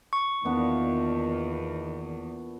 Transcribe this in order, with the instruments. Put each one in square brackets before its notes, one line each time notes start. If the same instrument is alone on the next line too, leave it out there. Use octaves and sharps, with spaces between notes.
[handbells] C#6
[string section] E2 [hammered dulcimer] A#2 B3 D4 [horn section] D#3